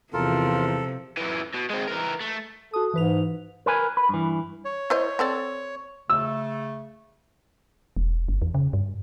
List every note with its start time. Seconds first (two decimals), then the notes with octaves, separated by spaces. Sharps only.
0.13 E2 C3 F3 F4 A4 A#4
1.17 F#2 E3
1.54 B2
1.70 G#3 C4
1.88 E3 A#4
2.21 A3
2.73 F#4 A4 D#6
2.94 G#2 E3 B4 F7
3.66 A#4 B4 G#5
3.97 B4
4.09 G2 E3
4.65 C#5
4.90 E4 C5 D#5
5.19 C4 A4 D5
6.10 C#3 A3 E6
7.97 E1
8.28 G1
8.42 E2
8.55 C#3
8.73 G2